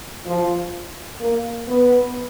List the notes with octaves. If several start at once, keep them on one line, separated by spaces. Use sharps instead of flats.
F3
A#3
B3